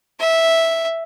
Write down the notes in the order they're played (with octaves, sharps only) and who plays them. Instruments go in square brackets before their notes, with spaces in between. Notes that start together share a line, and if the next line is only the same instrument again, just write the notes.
[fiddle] E5